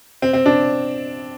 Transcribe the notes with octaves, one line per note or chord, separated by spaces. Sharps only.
C4
C4
D4